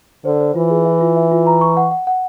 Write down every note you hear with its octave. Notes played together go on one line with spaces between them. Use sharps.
D3 C5
C5
E3 F4
G#4
E5
F4
E5
F4
A#5
C#6
F#5
F#5
F#5